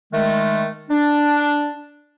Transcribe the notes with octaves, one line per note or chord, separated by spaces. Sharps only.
D#3 G#3 A3
D4